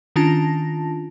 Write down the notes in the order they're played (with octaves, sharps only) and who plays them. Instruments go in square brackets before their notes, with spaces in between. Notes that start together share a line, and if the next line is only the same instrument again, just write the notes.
[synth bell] D#3 C#4 D4 F4 A5 A#6